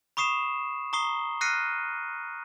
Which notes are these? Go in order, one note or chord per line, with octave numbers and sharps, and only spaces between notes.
B5 C#6 D#6 C7 E7
A#5 C#6 D#6 C7 G7
F6 F#6 A#6 C7 C#7 D#7